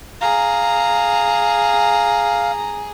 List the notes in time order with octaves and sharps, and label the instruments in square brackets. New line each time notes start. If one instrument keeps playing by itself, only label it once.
[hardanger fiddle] G#4 [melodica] F5 [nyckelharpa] A#5